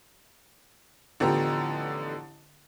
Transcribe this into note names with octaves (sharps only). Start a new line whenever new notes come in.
A1 D3 F3 B3 G4 A#5